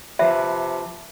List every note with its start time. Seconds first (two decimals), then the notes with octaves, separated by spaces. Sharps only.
0.19 C3 F3 B4 E5